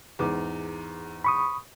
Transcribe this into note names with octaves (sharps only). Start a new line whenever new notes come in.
E2 G#2 D6
B5 C#6 D#6